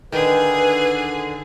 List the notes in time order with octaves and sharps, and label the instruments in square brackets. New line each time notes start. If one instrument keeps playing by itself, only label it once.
[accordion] D3 [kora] D#3 [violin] G#4 [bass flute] B4